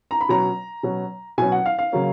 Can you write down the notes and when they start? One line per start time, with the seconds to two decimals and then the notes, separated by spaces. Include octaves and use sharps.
0.11 A#5
0.21 B5
0.29 B2 F#3 C#4 A#5
0.83 B2 F#3 C#4
1.38 B2 F#3 C#4 G#5
1.52 F#5
1.66 F5
1.79 F5
1.92 C#3 F#3 A#3 C#4